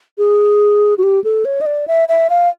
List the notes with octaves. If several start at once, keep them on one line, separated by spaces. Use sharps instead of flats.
G#4
F#4
G4
A4
C#5
D#5
D5
E5
E5
F5